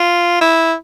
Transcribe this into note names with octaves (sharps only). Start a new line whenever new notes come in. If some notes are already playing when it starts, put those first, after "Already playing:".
Already playing: F4
E4